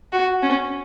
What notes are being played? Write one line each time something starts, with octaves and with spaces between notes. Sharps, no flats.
F#4
C#4